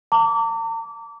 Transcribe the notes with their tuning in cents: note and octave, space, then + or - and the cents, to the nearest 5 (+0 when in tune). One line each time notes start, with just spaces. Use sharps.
A#5 -45 D6 -25